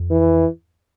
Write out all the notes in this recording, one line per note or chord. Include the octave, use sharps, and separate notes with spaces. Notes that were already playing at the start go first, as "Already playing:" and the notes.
Already playing: F2
E3